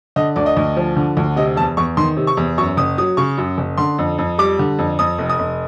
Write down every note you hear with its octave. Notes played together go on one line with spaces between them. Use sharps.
D3 D#5
D2 D5
D#5
D2
F3
D3
D2
C3 D#5
E2 A5
E2 C#6
D#3 C6
C3
C#6
E2
F#2 C#6
F#1 D#6
F#3 D#6
C#3 C#6
F#2
F#1
D3 C6
F2
F2
G3 D6
D3
F2
F2 D#6
F1
D#6
F1